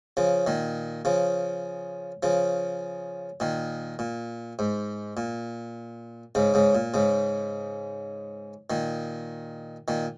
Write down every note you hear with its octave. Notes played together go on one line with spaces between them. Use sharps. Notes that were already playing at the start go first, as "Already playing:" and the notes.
C#3 F3
A#2 D#3
C#3 F3
C#3 F3
A#2 D#3
A#2
G#2
A#2
G#2 C#3
G#2 C#3
A#2
G#2 C#3
A#2 D#3
A#2 D#3